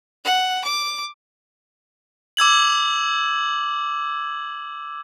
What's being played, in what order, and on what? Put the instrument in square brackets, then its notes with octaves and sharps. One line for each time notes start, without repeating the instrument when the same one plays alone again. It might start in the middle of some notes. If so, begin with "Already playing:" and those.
[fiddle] F#5
D6
[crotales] D6 E6 G#6 F#7